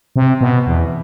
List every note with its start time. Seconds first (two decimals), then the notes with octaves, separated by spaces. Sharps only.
0.16 C3
0.41 B2
0.67 E2